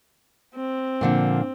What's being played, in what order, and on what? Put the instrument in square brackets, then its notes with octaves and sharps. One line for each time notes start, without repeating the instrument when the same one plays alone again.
[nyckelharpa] C4
[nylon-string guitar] A#2 D3 F3